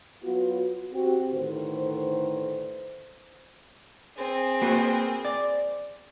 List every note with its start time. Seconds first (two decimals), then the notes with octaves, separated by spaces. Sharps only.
0.24 F#3 B3 F4 F#4
0.92 C4 F#4 G4
1.31 A2 D3 D#3 B4 C5
4.16 C4 G#4
4.62 A#3 F#4 B4
5.25 D5